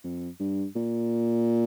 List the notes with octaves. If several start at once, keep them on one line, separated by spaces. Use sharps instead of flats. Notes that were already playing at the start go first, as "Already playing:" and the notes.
F2
G2
A#2